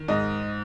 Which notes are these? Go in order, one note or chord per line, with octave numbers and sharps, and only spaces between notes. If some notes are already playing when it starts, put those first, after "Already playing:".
Already playing: D#3
G#2 D#5